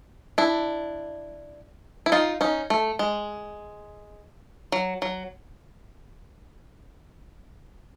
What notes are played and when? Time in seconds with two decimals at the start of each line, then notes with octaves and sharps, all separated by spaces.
0.38 D4 E4
2.06 E4
2.12 D#4 F4
2.41 C#4 D#4
2.70 A3
2.99 G#3
4.72 F#3
5.02 F#3